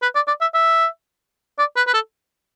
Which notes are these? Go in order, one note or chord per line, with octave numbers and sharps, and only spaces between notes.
B4
D5
D5
E5
E5
D5
B4
B4
A4